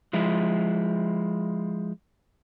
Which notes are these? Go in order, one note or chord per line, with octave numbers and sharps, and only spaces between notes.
F3 G#3 E4